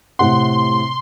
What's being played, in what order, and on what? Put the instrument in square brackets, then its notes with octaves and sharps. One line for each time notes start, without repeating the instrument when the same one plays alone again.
[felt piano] A2 C3 F#5 [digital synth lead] C6